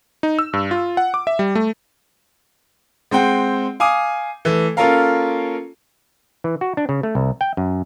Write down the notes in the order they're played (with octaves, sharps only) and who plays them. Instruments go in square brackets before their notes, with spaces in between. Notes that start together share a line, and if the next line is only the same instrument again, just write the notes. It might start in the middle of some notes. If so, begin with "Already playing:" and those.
[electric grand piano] D#4
E6
G2
F4
F#5
D6
E5
G3
A3
[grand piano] G#3 C4 F#5 G5
F5 G#5 D6 D#6
E3 A3
A#3 C#4 F4 A4 A#4 F5
[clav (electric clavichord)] E3
F#4
D4
C#3
A3
C2
G5
F#2